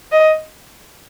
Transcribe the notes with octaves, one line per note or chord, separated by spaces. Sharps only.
D#5